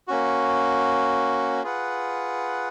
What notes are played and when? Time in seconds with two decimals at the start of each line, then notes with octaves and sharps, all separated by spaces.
0.08 A#3 C#4 F#4
1.64 F4 G#4 B4 F#5